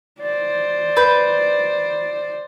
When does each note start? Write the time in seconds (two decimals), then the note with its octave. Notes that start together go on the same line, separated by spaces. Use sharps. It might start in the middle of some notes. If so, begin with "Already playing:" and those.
0.20 C5 D5
0.97 B4 G6